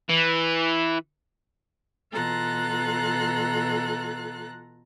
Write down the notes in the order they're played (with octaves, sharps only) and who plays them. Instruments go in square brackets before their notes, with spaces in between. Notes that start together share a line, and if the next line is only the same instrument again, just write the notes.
[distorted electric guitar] E3
[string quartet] B2 E3 F4 A4 A#5 F#6